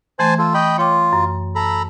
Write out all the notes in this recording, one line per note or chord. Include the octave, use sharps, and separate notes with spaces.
E3 A3 C5 G#5 A5
F4 A4
D#5 G5 B5 C#6
F4 C#5 G5 D6
F#2
A4 A#5 B5